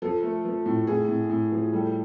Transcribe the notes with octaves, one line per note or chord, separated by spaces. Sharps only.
F3 A4
A3
F3
A2
A2 G#4
A2
A2
F3
G3 A4